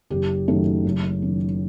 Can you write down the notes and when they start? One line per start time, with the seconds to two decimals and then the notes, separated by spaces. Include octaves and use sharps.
0.10 F#1 G4
0.48 F#2 D#3 F#3 A3
0.85 F#1
1.22 F#2 D#3